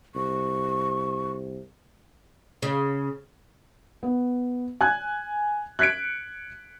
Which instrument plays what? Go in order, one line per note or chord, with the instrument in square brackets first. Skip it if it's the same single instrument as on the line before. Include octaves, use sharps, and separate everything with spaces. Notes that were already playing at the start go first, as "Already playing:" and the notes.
[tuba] C2 [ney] C#6
[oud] C#3
[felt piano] B3
G#5 F#6 G#6
F#6 G#6 B6 C#7 D7